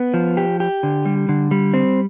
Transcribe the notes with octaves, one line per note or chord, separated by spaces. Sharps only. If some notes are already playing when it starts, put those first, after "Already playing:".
Already playing: B3
F3
G4
G4
D3
G3
D3
G3
C4